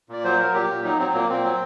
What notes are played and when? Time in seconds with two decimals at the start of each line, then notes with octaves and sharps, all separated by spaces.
0.09 A#2 D5
0.24 F#3 C5
0.39 F#3 A#4
0.54 A#2 G4
0.69 A#2
0.84 F#3 D#4
0.99 F#3 C4
1.13 A#2 A#3
1.29 A#2 C4
1.44 F#3